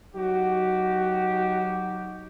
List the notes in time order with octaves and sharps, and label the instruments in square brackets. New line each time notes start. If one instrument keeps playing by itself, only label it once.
[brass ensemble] F#3 D#4 F#4 G4